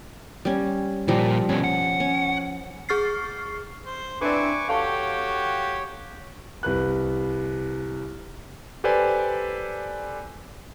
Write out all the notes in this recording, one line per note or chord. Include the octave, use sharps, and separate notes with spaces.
G3 C#4
A#2 F3 G3 A#5
G2 B2 C#4
F#5
C#4
G#4 C#6 F6 A6 C7
C5
C4 D4 E4 B4 D5 G#5 C#6 D6
F#4 G4 A4 C#5 F5 G5 A5 C#6
C2 B4 F#6
G4 A4 B4 C5 D5 G#5